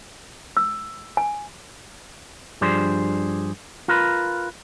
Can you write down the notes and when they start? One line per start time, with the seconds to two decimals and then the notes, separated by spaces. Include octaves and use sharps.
0.57 E6
1.17 G#5
2.61 G2 F3 D4 G4 G#4 C5
3.88 F4 A#4 B4